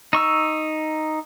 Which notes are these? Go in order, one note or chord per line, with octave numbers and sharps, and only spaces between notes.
D#4 C#6 E6